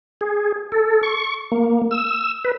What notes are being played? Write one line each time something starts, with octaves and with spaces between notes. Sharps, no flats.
G#4
A4
C#6
A#3
E6
B4